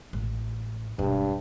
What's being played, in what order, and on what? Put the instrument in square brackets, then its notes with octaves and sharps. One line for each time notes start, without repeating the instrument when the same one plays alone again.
[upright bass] A1
[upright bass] E1 [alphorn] G2